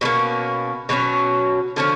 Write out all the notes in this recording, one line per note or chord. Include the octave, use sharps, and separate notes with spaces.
B2 F#3 A#3 C#4
B2 F#3 A#3 C#4
D3 F3 A3 C#4